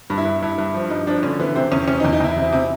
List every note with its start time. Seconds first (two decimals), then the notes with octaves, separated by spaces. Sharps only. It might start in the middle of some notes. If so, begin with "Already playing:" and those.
0.10 G2
0.18 E4
0.25 G2
0.42 G2 E4
0.58 G2
0.74 F3
0.90 G2 D#4
1.07 F3 D4
1.23 D3 C#4
1.39 E3 B3
1.55 C3 C4
1.71 E2 C#4
1.88 C3 C#4
2.00 D#4
2.04 E2
2.13 D#4
2.20 E2 E4
2.37 C3
2.52 C3